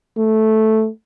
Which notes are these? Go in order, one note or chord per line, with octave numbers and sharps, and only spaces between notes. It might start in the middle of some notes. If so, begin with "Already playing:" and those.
A3